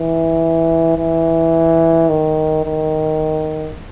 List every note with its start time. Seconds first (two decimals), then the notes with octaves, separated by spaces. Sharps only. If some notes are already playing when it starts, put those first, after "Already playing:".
Already playing: E3
0.98 E3
2.09 D#3
2.65 D#3